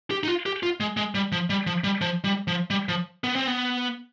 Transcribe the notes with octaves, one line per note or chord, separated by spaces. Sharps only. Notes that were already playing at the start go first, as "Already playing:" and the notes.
G4
D#4
F4
G4
F4
G#3
G#3
G3
F3
G3
F3
G3
F3
G3
F3
G3
F3
B3
C4
B3